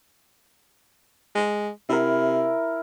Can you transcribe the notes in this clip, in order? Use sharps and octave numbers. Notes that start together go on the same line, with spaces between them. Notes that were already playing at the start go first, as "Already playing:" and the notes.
G#3
C3 E4 A#4